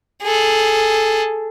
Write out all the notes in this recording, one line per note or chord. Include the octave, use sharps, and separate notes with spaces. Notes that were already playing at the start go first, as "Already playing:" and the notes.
G#4 A4